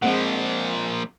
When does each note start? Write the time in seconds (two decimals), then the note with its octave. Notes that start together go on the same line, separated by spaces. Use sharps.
0.02 A#2 F3 G#3 C4 F#5